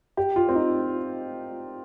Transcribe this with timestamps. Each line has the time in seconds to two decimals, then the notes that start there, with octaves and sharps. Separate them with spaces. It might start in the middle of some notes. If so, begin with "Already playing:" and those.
0.17 G4
0.36 F4
0.49 C4
0.55 D#4